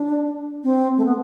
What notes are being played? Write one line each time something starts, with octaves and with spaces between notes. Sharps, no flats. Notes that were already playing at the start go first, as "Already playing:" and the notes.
Already playing: D4
C4
A3
B3